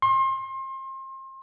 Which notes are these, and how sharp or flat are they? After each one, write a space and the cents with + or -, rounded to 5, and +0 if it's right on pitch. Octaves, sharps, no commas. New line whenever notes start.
C6 +30